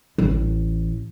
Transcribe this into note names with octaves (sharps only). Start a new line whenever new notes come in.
A1